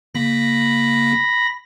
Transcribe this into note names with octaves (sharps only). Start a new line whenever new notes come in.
C#3 A#3 B5 A#6